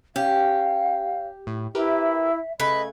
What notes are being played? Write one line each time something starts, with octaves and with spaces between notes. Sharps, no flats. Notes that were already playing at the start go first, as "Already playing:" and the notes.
C#4 G4 F5
A2
E4 G4 A#4 B4 E5
C#3 A3 B4 D#5 B5 G#6